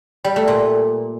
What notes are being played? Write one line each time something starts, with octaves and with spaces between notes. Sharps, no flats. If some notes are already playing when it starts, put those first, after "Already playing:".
G3
A3
A#2